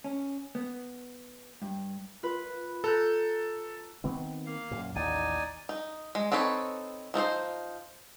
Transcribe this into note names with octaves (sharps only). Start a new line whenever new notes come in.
C#4
B3
G2
F4 B4 B5
A4 A#5 F#6 G6
D#3 B3 C4
A#3 F5
F#2 A#2
A1 D#2 D#4 D5 G#5
D#4
G#3
C4 D#4 A4 B4 C#5
F3 D#4 A4 C5